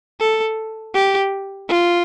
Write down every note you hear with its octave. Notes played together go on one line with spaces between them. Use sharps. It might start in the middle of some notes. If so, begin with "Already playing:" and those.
A4
G4
F4